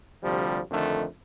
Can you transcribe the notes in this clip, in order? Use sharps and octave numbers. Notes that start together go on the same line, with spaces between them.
D2 C3 F3 G3
F2 D3 D#3 A3